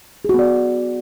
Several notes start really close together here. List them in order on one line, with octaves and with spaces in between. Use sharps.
G#4 F#4 B3 D5